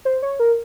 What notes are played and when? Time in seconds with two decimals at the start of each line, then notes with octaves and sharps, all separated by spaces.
0.05 C5
0.22 C#5
0.40 A#4